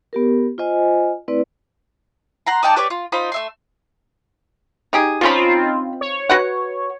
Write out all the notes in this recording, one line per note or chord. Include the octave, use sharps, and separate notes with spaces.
B3 G4 A#4
F4 C5 D#5 G#5
A3 C4 E4 B4 D5
F#5 A#5 C6
D#4 D5 G5 A5
G4 B4 C#5 D5
F4
D#4 F4 C5 B5
A3 E5 C6
D#4 G4 G#4
F3 C4 C#4 D#4 F4 B5
C#5
F#4 B4 F#5